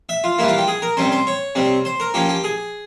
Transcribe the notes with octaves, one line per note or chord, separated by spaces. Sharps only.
E5
F4
E3 G3 A#3 E4
F4
G4
G#4
A#4
C3 G3 C#4 C5
C5
C#5
C3 G3 C4
C5
A#4
F3 A#3 C#4 G4
G4
G#4